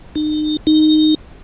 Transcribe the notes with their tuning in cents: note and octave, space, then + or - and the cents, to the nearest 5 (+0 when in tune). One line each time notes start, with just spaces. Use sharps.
D#4 -35
D#4 -10